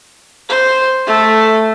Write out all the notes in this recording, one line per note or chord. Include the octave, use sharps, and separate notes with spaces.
C5
A3